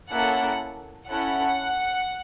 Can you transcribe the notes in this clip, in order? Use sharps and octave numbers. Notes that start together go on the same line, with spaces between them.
A#3 C#4 E4 A4 F#5
C#4 E4 A4 F#5